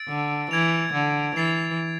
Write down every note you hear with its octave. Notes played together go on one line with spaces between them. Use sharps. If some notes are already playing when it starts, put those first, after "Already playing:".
Already playing: E6 A6 D7
D3
E3 G#6 D7 F7
D3
E3 A6 C7 F7